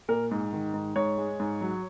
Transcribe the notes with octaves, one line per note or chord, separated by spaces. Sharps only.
A#2 A#4
G#2
D#3
G#2
G#2 C#5
G#3
G#2
F#3